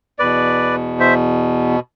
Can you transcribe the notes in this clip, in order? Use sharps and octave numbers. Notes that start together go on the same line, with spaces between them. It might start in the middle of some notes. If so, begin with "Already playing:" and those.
E2 B2 B4 D5
C5 E5